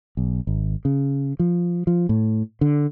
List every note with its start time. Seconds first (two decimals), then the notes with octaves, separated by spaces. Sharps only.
0.17 B1
0.47 G#1
0.85 C#3
1.39 F3
1.87 F3
2.09 A2
2.61 D3